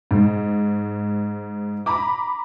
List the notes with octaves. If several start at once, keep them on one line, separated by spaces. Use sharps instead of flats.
G#2
A#5 B5 D6